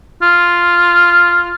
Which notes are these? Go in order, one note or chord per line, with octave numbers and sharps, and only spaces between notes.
F4